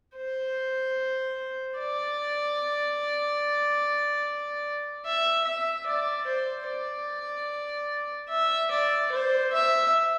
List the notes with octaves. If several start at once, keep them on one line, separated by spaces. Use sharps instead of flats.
C5
D5
E5
E5
D5
C5
D5
E5
D5
C5
E5